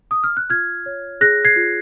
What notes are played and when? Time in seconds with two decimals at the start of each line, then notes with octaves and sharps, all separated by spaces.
0.11 D#6
0.23 F6
0.37 F#6
0.50 F4 F6 G#6
0.86 C#5
1.21 G#4 F#6 A#6
1.45 G#6 C7
1.56 F4